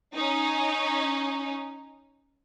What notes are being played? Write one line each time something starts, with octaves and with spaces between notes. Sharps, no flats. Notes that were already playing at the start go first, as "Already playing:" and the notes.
C#4 D#4